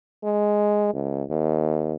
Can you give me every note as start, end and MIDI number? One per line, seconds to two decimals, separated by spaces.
0.24 0.93 56
0.94 1.24 37
1.30 1.95 39